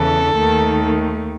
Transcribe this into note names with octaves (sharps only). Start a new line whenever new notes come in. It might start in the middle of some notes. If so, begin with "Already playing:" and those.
Already playing: E2 C#3 E3 A4
D#2 D#3 A3